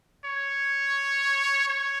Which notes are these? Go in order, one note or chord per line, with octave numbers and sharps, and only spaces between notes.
C#5
C#5